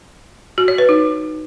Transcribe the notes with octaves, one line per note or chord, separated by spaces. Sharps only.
F#4
C#5
B4
D#4